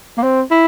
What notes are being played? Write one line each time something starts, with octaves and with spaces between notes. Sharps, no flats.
A#3
C4
E4